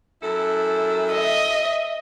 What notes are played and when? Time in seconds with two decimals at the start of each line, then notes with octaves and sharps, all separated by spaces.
0.22 F#2 E4 A4
1.13 D#5 E5